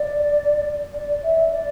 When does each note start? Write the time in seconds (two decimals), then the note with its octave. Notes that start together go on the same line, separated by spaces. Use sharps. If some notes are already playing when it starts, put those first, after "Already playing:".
Already playing: D5
0.94 D5
1.23 E5
1.52 D5